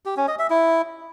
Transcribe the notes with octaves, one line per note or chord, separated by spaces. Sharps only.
G4
C#4
D#5
E5
E4